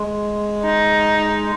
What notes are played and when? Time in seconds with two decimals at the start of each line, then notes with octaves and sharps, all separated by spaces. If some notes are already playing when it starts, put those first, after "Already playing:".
Already playing: G#3
0.64 D#4